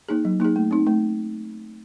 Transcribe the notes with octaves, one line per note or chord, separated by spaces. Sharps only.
A#3 D#4 G#4
F#3
A#3 D#4 G#4
A3
C4 D#4
A3